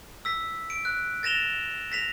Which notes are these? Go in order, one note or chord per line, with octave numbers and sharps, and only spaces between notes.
E6 B6
D7
F#6
A6 A#6 E7 F7 G7
A#6 B6 F7